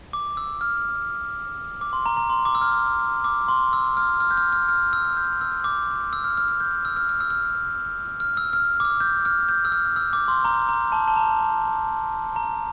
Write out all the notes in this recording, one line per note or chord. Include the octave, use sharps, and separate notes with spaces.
D6
E6
F6
D6
C6
A#5
A#5
C6
D6
E6
F6
D6
C6
E6
F6
F6
G6
F6
F6
F6
E6
G6
E6
D6
E6
F6
F6
F6
G6
E6
F6
F6
E6
F6
F6
E6
F6
D6
E6
G6
F6
G6
E6
F6
E6
D6
C6
A#5
A#5
A5
A5
A#5
A#5